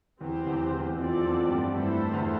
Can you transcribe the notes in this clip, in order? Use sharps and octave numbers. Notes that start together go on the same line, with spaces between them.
E2 E3 C4 G4 C5
E2 E3
E2 E3
F2 F3 C4 F4 A4 D5
F2 F3
G2 G3
G2 G3 A3 E4 A4 C5
E2 E3